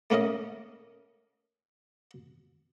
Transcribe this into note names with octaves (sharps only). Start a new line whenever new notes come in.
A3 A#3 C#4 A#4 D#5